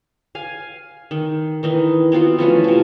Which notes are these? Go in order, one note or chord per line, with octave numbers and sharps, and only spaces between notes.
F5 G#5
D#3
D#3 E3 D#4
B3 C4 F4 F#4
E3 F3 A3 C#4
C3 F3